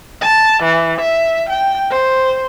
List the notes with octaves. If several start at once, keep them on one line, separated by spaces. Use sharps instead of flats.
A5
E3
E5
G5
C5